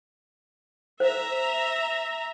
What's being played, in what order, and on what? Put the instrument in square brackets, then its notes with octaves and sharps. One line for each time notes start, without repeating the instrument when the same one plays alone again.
[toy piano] C5 [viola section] E5 A#5